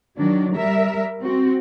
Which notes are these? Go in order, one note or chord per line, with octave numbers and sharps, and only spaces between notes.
D#3 F#3 D4
G3 A#4 E5
C4 F#4